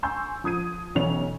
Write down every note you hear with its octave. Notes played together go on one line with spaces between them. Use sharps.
G#5 C6 C#6 E6 G6
F3 D#6 G#6 D#7
B1 E3 C#4 C#5 F7